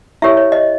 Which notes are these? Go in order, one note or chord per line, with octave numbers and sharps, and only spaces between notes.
E4 G4 A#4 C#5 E5
C#5
D#5